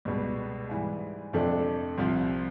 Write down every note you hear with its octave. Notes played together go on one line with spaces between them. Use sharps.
C#2 B2 G3
G#2 E3 G3
F2 C3 F3 A3 D4
C2 C3 F3